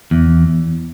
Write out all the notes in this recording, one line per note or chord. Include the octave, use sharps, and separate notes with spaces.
E2